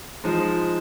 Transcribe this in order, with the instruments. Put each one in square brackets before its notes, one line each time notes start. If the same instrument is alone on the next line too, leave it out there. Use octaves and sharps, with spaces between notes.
[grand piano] F3 G#3 D#4